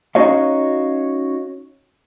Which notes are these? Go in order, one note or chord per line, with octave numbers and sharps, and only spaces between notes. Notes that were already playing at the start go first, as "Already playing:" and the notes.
C#4 D#4 F#4 C#5 D#5 F5